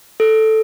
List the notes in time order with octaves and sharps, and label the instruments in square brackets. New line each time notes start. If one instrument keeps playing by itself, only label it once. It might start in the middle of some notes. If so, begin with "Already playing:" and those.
[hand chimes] A4